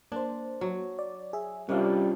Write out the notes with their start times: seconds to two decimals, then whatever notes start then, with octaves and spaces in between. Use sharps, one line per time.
0.12 A#3 D4 C5
0.61 F#3
0.99 D5
1.33 G#4 E5
1.69 C3 G3 C#4 D4 F4 A#4 D5 F5